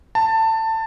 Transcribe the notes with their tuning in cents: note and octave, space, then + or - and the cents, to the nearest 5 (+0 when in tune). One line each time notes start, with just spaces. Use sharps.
A5 +20